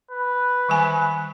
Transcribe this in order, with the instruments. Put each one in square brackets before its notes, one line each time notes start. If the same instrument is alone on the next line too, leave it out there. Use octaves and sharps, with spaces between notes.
[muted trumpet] B4
[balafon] D#3 G3 G#5